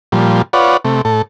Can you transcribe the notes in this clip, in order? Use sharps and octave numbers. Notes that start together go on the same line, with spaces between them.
A#2 F3 G3
F4 B4 C#5 D5 F#5
C3 A3
A2 A4